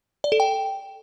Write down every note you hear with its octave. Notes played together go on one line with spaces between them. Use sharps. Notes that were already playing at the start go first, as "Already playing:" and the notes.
D5
A4
G5